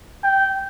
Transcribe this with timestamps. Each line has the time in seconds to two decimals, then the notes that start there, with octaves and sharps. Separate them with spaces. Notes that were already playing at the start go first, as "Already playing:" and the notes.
0.23 G5